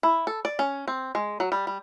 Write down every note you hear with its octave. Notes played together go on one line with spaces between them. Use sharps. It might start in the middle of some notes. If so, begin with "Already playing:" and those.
E4
A4
D5
C#4
C4
G#3
F#3
G3
G3